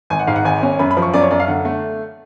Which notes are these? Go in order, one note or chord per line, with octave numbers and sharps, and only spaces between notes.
G#1 G#5
F#5
G#2 F5
F#5
G#1 G#5
C#4
F#2 B5
B5
F3
C#6
F#2 D5
C#5
F#2 D5
F5
D3 F#5
A3